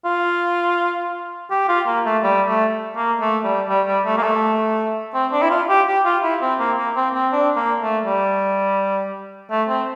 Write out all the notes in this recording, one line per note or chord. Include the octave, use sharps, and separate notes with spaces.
F4
G4
F4
A#3
A3
G3
A3
A#3
A3
G3
G3
G3
A3
A#3
A3
C4
D4
E4
F4
G4
G4
F4
E4
C4
A#3
A#3
C4
C4
D4
A#3
A3
G3
A3
C4